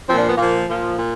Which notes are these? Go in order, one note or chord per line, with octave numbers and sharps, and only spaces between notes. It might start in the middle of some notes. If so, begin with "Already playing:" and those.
A#2 F3 C4
D4
B3
A#2 F3 A#3
A#2 F3
A#2